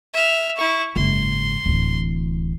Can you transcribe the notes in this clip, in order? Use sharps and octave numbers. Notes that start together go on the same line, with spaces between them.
E5 F6
E4 C#6
F#1 G#2 C6
D1 E3